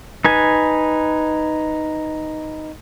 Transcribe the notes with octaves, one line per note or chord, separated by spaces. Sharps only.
D#4 B4 G#5